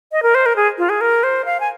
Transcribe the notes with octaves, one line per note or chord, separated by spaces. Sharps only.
D#5
A#4
C5
A#4
G#4
F4
G#4
A#4
C5
F5
G#5